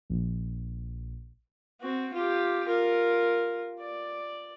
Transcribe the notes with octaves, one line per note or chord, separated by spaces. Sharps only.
A#1
C4 F#4
F4 G4
F4 A#4
D5